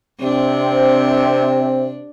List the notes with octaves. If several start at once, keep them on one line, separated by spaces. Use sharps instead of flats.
C3 C4 D4